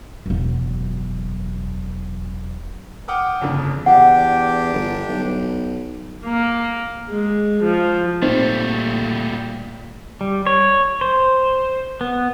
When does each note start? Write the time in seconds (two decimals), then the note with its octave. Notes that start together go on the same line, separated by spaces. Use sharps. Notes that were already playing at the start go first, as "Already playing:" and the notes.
0.26 E1 F#2
3.08 F#5 G5 D6 D#6 F6
3.41 G1 F2 C#3 A#3 D4
3.86 E2 D4 G4 F#5 G5
4.74 G1
5.09 B1
6.25 A#3
7.11 G#3
7.63 F3
8.23 A#2 G3 A3 C4 D#4 C5
10.21 G3
10.47 C#5
11.01 C5
12.01 B3